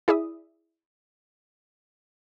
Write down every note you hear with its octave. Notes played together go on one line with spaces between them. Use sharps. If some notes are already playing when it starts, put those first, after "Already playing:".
E4 G#4 D5 E5 D#6